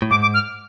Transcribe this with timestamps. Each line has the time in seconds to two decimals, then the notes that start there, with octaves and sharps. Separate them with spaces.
0.02 A2
0.11 G#2 D6
0.22 D6
0.34 F6